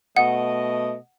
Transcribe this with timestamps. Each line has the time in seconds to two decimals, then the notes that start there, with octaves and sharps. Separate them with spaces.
0.16 B2 A3 D#5 F#5